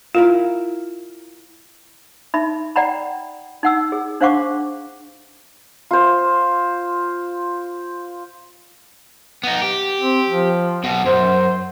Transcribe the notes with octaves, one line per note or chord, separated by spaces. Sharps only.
E4 F4 A#4 F5
D#4 E5 B5
D5 F#5 G5 A#5 B5
D#4 F#5 E6
G#4
D4 C5 F5 F#5 C#6 D6
F4 C5
B3 D#4
G4
C4
F3
B1 B2
F#2 C5